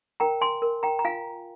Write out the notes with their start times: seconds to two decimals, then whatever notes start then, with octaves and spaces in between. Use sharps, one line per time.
0.20 A#4 G5 A#5
0.41 G#5 C6
0.62 A#4
0.83 G5 A#5
0.99 A#5
1.05 F4 F5 G#5